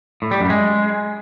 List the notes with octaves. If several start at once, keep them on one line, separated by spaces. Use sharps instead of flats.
A2
G3
F#2
G#3